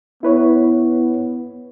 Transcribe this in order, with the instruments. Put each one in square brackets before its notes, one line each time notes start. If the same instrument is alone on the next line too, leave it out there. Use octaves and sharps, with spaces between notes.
[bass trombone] B3 [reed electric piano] E4 B4 C#5